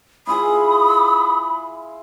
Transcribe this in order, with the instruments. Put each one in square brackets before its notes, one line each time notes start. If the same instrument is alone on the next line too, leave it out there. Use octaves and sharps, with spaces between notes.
[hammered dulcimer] E4 F4 G#4 [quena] B5 [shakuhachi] D#6